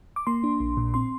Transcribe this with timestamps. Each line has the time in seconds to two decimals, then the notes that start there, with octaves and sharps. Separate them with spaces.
0.16 D6
0.27 A#3 C6
0.44 D4
0.60 A#1
0.77 A#2
0.94 C4 C6